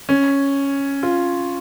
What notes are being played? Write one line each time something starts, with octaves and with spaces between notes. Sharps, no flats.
C#4
F4